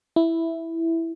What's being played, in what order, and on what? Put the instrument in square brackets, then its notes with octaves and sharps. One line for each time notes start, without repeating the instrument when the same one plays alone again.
[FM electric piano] E4